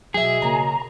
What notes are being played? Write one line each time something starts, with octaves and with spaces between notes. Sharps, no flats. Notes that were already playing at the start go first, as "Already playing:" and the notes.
B2 F#3 G#4 E5
C#3 A#3 A#5